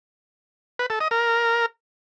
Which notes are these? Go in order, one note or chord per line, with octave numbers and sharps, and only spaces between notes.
B4
A4
D#5
A#4